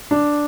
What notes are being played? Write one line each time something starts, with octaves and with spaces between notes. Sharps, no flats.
D4